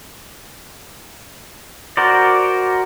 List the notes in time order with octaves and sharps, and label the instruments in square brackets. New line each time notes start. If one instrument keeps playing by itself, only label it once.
[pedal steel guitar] F#4 A#4 C5 D5